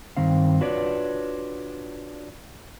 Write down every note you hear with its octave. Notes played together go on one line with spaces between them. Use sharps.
G2 D#3 C4 F5
D4 F4 F#4 B4 C#5 D5